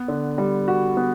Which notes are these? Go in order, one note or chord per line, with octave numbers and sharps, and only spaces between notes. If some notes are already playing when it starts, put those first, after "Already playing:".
Already playing: B3
D3
G3
F#4
B3